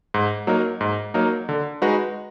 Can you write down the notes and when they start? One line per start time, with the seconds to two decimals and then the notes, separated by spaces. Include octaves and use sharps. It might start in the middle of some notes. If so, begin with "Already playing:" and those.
0.14 G#2
0.47 F#3 A#3 D#4 A#4
0.81 G#2
1.14 F#3 A#3 D#4 A#4
1.49 D3
1.82 G#3 D#4 F#4 B4